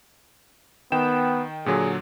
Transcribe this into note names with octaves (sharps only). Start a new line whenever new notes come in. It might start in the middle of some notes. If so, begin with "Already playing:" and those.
D#3 B3 G5 E7
A#2 D3 F#3 G#4